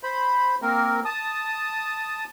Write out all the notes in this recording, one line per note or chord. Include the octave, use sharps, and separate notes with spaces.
C5 B5
A#3 C4 A#4
A5 D#6